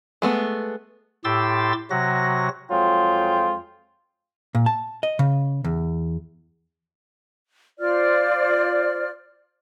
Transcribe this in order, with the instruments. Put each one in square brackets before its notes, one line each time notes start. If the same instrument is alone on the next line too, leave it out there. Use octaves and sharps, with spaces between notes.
[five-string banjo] G#3 A3 B3
[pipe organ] A2 G4 C6 D6 E6 A6
C3 F#3 F#4 A#6
[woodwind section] F2 F#3 G#3 F4 G5
[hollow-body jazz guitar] A#2
A5
D#5
C#3
E2
[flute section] F4 C5 D5 F6